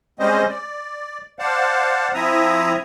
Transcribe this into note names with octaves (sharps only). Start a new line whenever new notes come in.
G3 G#3 C4 C#4 C5 D#5
D5
C5 D5 F5 F#5 A5
F3 C4 E4 E5 A#5 D#6